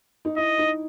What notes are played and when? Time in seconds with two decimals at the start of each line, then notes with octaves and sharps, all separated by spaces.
0.25 D#4
0.37 E4 D#5
0.58 D#4